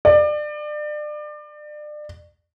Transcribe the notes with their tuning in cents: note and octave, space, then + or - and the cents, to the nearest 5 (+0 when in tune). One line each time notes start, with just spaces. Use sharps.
D5 +30